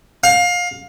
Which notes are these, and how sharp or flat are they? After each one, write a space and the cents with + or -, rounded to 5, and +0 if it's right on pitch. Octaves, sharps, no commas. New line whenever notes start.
F5 +25